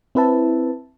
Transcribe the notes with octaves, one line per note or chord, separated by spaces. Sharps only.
C4 E4 B4 E5 A5